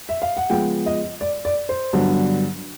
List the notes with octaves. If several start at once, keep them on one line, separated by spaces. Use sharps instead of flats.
E5
F5
F#5
C#3 F3 G#3 B3 G5
D#5
D5
D5
C5
G2 D3 F#3 B3